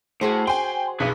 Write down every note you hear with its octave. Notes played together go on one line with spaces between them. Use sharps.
A2 F#4 G#4 C5
G5 G#5 C6
B1 G#4 B4